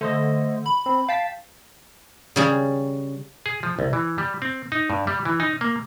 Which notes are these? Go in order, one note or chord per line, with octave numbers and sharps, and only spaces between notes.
D3 A3 C5 D#5
B5
C4
F5 G5 A5 B6
C#3 G3 G#4
G#4
F3
C2
E3
G3
C4
D#4
G2
G3
E3
D#4
A#3